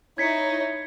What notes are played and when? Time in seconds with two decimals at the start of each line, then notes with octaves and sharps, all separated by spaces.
0.18 D#4 E4 C#5 G#6 B6 C#7